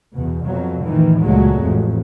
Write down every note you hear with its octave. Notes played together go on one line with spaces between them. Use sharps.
E2 B2
F2 B2 F#3
A2 D#3 E3
C#2 A#2 F#3 G#3 A3
A1 F2